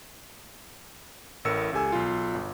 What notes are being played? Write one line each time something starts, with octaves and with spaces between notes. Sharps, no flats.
A1 A2 A#4 E6 C#7
C#2 G4 A4 G#5 E6
B1 F4
G1